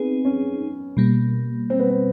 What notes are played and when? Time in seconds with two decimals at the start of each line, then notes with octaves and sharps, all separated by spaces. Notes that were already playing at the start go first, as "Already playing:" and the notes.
Already playing: B3 C4 D#4 G#4
0.25 C#4
0.97 B2 G3 A#3
1.70 C4
1.80 B3
1.90 C4